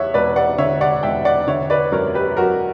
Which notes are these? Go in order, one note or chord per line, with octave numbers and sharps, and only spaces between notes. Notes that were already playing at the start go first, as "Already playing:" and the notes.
Already playing: E2 C#5 E5 F#5
E1 B4 D5
D5 F#5
D3 C#5 E5
D5 F#5
E1 E5 G5
D5 F#5
D3 C#5 E5
B4 D5
F#2 A#4 C#5
G4 B4
F#3 F#4 A#4